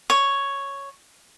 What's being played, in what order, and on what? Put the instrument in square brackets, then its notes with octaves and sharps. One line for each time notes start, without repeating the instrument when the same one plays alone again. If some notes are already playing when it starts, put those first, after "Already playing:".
[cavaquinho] C#5